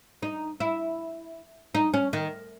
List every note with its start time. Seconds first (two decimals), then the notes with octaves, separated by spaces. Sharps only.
0.22 D#4
0.60 E4
1.75 D#4
1.94 C#4
2.13 D#3